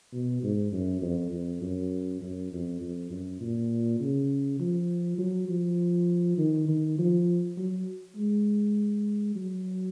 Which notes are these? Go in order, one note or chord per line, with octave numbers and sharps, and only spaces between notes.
B2
G#2
F#2
F2
F2
F#2
F#2
F2
F2
F#2
A#2
C#3
F3
F#3
F3
D#3
D#3
F3
F#3
G#3
F#3